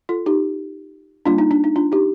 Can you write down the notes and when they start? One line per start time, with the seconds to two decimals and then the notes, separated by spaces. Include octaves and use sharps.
0.09 F4 A4
0.26 D#4 G4
1.26 G3 A#3 D4 F4
1.38 D#4
1.51 D4
1.64 D#4
1.76 D4 F4
1.92 D#4 G4